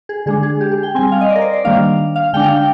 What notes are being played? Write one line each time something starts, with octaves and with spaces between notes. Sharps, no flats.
G#4
D3 G#3 D4 G#4
G#4
G4
G#4
G5
G3 C4 G#5
F5
D#5
D5
A#4
C5
D5
D#3 G3 A#3 D4 F5
F5
D3 G#3 D4 G5
F5
G5